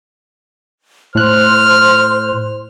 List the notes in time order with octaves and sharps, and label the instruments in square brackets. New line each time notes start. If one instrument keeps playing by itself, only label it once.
[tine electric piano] A2 F#6 [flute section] C5 C6 [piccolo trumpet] F6